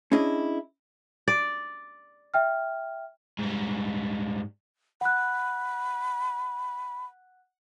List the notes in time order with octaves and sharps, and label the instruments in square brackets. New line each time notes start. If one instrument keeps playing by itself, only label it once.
[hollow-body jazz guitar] C#4 D4 E4 G#4 D#5
[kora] D5
[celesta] E5 G5 F6
[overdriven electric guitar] G#2 G3
[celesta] F#5 F#6 [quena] B5